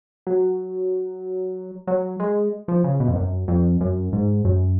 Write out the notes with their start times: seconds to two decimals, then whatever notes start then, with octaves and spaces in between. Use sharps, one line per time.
0.27 F#3
1.87 F#3
2.20 G#3
2.68 F3
2.84 C#3
3.00 B2
3.08 F2
3.16 F#2
3.48 F2
3.80 F#2
4.13 G#2
4.45 F#2